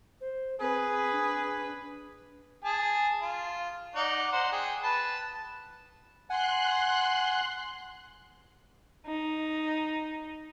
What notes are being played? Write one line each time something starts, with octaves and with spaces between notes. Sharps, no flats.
C5
C4 G#4 B4
D4
G#4 A5
F4
D#4 D5 F#5
C5 F#5
G#4 G5
B4 A5
F#5 G#5 C6 F#6
D#4